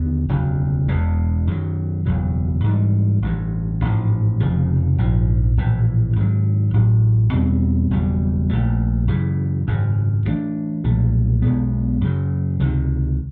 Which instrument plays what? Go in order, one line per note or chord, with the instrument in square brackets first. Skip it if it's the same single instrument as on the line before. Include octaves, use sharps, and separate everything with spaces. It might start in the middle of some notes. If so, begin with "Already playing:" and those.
Already playing: [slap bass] D#2 D3 B3
E1 D2 C#3 F#3
E1 E2 B2 G#3
F#2 D#3 F#3
F#1 E2 B2 F#3
G#2 E3 G3
A1 G2 E3
A1 G#2 F3
F1 F2 C#3 F3
A#1 G#2 F3
A#1 A2 E3
G#2 D#3 F#3
A1 A2 F#3
E2 B2 G3 C4
F#1 E2 B2 G3
A#1 A#2 F3 A3
F#2 C#3 E3
G#1 F#2 C#3
G2 E3 A3 D4
B1 A#2 F3 A3
B1 B2 G#3 B3
F#2 C#3 F#3
C#2 C3 D#3